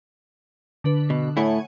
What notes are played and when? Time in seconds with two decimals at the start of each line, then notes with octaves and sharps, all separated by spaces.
0.84 D3 D4 B4
1.10 B2
1.37 A2 A3 E4 C#5 F#5 G#5